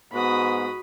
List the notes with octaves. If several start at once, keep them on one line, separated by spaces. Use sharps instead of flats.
G#2 B3 F#4 B5 D#6